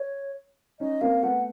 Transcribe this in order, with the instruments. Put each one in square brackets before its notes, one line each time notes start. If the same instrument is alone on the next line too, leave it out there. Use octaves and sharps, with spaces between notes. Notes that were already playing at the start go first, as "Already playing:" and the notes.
Already playing: [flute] C#5
[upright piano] C#4 D#4 [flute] D#5
[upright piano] A#3 C4 [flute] F5
[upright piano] A3 B3 [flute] F#5